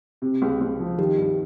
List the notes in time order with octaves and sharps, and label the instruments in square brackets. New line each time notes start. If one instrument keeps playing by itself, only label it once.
[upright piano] C3
C#2
C#2
F3
[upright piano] D#3 [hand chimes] G4
[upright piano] G2